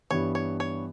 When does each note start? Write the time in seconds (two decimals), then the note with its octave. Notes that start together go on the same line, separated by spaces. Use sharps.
0.11 G2 E3 G3 B3 C#5
0.35 C#5
0.60 C#5